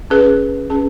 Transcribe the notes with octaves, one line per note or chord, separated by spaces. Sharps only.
C#4 G#4 B4
C#4 G#4 B4